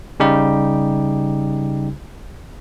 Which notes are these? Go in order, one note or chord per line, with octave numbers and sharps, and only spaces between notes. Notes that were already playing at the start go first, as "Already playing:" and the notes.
C#3 G3 D#4 G4